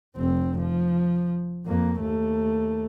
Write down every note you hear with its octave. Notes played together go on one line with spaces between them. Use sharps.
F1 C4
F3
F2 A#3
D#2 A3